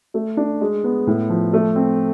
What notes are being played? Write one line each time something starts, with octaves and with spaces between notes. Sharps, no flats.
A3
D4
G#3
B3
A2
F3
A3
C4